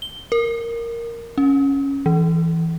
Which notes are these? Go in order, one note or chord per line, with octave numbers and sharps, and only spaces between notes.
G7
A#4
C#4
E3